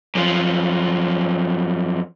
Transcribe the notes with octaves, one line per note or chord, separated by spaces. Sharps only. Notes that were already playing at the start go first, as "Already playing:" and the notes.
F#2 F3